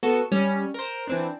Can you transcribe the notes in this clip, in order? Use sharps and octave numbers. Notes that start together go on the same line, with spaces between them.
B3 F#4 A4
G3 C#4
A#4 C5
E3 C4 D4